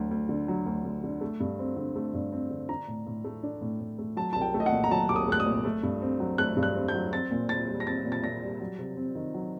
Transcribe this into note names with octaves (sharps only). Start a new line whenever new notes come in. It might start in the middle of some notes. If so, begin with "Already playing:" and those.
Already playing: D2 F#3
D2
D3
F#3
D2
D2
D3
A3
G2
C4
D3
A3
G2
C4
D3
D4 A#5
A2
A2
A3
D4
A2
A2
A3
F#3 A5
C2 A5
G5
A3
D#5
F#5
A#2
A#5
F#3 A5
C2 D6
D#6
A3 F#6
D#6
A#2
A3
G2
C4
F#3
A3 F#6
G2
F#6
C4
G6
F#3
C4 A6
A#2
A#2 A6
G3
A#6
C4 A6
A#2
A6
A#2 A#6
G3
F#3
C3
C4
D#3
F#3